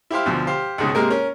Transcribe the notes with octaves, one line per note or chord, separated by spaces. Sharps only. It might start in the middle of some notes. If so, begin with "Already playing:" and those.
E4 G4 C5 F5
D2 B2 F3
G4 C5 F5
C#2 G#2 B2
C3 G#3 A#3 A#4
C#4 A#4